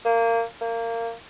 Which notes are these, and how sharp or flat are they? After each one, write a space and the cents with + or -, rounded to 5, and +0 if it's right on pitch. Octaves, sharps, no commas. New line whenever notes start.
A#3 -20
A#3 -20